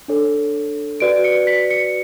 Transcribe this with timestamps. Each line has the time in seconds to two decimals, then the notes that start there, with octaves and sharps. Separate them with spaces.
0.08 D4 A4 C#5
1.00 F#4 B4 D5 D7
1.24 C#7
1.47 B6
1.71 C#7